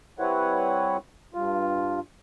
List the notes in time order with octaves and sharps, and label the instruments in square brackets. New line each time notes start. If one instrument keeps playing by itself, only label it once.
[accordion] G3 C4 E4 B4 C#5 F#5
G2 F4